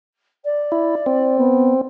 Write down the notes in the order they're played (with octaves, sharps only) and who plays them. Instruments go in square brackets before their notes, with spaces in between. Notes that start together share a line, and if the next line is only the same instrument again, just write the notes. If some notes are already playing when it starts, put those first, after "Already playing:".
[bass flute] D5
[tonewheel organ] E4
C4
[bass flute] B3